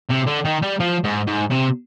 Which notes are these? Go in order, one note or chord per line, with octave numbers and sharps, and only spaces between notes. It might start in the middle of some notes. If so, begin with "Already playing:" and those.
C3
D3
D#3
G3
F3
G#2
G#2
C3